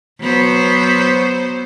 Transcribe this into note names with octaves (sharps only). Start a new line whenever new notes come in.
F#3 B3 C5